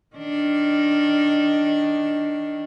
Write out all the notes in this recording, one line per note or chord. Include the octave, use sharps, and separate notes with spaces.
D#3 D4